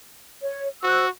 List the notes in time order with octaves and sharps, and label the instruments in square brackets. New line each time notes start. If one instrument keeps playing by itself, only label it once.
[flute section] C#5
[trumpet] F#4 [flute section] C5 E6 F#6